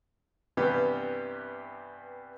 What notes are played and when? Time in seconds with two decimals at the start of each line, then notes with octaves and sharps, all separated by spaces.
0.57 G2 C3 E3 G3 B3 G4